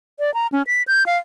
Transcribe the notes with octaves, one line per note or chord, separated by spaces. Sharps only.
D5
A#5
C#4
B6
G6
F5